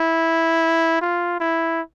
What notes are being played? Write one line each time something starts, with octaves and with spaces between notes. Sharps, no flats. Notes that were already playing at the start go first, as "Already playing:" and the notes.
Already playing: E4
F4
E4